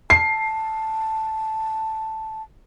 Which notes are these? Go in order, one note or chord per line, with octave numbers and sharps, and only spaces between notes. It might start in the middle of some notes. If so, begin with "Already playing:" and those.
A5 C7